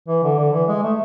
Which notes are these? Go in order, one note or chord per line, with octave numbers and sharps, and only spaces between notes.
E3
D3
D3
E3
G#3
A3